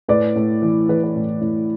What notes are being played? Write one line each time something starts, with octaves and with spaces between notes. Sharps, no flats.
A2 B4 D5
A2
E3
E3 B4
B4
A2
A2